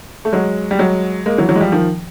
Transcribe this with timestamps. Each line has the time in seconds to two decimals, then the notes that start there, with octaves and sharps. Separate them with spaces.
0.25 A3
0.33 F#3 G#3
0.71 G3
0.79 F#3 G#3
1.26 G#3 A#3
1.38 E3 F#3
1.49 E3 F#3
1.55 G#3
1.61 F3 G3
1.72 D#3 F3